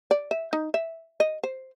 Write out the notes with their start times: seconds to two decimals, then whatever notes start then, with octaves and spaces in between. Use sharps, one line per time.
0.11 D5
0.31 E5
0.53 D#4
0.74 E5
1.20 D#5
1.44 C5